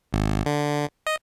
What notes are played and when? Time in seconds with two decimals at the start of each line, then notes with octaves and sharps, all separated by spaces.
0.13 G#1
0.46 D3
1.07 D#5